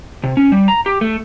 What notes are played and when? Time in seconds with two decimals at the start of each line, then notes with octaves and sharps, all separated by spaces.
0.24 C3
0.37 C#4
0.52 G3
0.68 A#5
0.86 G4
1.01 A3